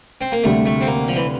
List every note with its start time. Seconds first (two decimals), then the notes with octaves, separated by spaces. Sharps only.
0.21 C4
0.32 A#3
0.44 D2 C3 G3 A3
0.66 A3
0.81 C4
0.87 A#3
1.08 F3
1.16 E3